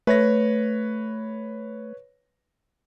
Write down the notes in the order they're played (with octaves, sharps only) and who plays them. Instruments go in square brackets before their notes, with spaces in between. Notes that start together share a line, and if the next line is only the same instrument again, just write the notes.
[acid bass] A3 [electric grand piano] B4 C#5 A#6